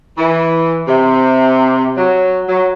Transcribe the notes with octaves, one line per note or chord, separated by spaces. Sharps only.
E3
C3
F#3
F#3